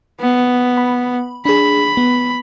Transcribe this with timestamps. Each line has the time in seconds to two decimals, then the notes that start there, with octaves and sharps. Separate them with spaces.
0.20 B3
0.77 B5
1.45 D4 G#4 B5
1.97 B3